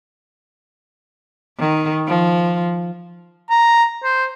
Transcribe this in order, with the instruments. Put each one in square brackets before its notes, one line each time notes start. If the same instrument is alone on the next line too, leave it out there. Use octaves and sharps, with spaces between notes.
[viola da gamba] D#3
F3
[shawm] A#5
C5